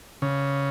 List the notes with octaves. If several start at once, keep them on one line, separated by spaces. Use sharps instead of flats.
C#3